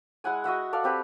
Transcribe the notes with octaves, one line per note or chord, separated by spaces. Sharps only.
G#3 E4 F#5 G#5
F#4 D#5 E5 F#5
A4 D5 F5
C4 G4 B4